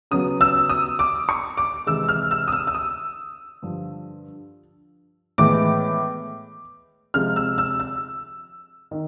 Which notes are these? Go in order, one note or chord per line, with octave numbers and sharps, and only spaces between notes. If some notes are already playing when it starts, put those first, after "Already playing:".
C#3 F#3 B3 D#6
E6
D#6
D6
C#6
D6
C3 E3 G#3 E6
F6
E6
D#6
E6
E6
D#6
G2 D3 F3
A2 E3 G#3 B3 D6
C3 F3 G#3 C4 F6
E6
E6
E6
D#3